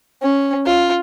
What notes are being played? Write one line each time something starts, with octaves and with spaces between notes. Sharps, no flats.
C#4
F4